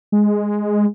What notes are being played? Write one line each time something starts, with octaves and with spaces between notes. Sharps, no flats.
G#3